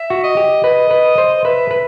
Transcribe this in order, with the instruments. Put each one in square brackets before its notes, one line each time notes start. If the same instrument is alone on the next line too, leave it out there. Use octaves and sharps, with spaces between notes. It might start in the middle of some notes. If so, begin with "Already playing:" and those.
Already playing: [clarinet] E5
[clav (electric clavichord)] F#4
[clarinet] D#5
[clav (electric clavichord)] G4
[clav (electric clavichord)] B4 [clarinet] D#5
[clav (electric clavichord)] B4
C5
[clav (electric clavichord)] B4 [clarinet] E5
[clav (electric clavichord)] B4